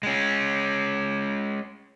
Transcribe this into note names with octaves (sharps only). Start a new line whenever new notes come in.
G#3 C#4